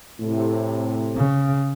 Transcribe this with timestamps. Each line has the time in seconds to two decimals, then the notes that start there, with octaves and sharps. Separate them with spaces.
0.20 A2 C3
1.16 C#3